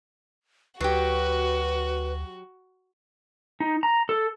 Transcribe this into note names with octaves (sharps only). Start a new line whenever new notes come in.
D2 F#3 F#4 G4 B4
D#4
A#5
A4